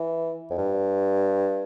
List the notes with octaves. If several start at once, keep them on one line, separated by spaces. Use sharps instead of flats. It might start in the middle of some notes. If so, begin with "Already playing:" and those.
Already playing: E3
F2
G2